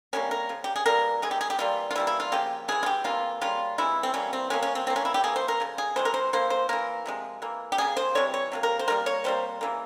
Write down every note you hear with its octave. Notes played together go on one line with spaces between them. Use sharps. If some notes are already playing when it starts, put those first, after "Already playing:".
C3 E3 G3 A#3 C#4
A#4
C#3 F3
G4
G#4
E3 G3 A#3 A#4
E3 G#3 G#4
G4
G#4
G4
E3 G3 A#3 F4
F4
E3 G3 A#3 E4
E4
F4
C#3 F3 A#3 G4
C#3 E3 G#3 G#4
F4
G4
C3 E3 A#3 F4
C#3 G3 A#3 F4
C3 E3 G#3 E4
C4
E3 G3 A#3 C#4
C4
C3 F3 A#3 C#4
C#4
C4
E3 A#3 C4
C#4
E4
G4
E3 A#3 G#4
C5
A#4
C#3 F3
G#4
C3 E3 G#3 C5
A#4
C5
E3 A#3 C5
C5
E3 A#3 A#4
C3 F3 G#3
E3 A#3
G4
C#3 G3 A#3 G#4
C5
C3 E3 G3 C#5
C#5
C3 F3 A#3
A#4
C5
C#3 G3 A#3 A#4
C#5
C3 G3 A#3 C5
C#3 E3 A#3